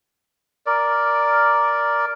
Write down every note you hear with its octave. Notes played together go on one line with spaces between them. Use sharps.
A#4 D5